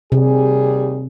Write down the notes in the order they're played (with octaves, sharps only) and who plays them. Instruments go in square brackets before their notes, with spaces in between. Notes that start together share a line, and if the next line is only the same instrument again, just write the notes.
[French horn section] D#2 G3 G#4 [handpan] C3